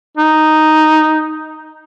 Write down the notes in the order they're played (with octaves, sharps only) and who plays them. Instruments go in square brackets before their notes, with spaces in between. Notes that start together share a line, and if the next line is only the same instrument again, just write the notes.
[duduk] D#4